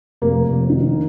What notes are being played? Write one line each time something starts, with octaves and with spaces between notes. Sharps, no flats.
F1 A#3
F1
D#3